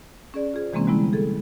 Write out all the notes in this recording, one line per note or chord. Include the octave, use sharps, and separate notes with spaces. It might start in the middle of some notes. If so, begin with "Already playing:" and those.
C#4 G#4 D5
F4 G#4 C5
C3 E3 G#3 A#3 C4 C#4
D3 G3 G#3 B3 E4
G#4 A4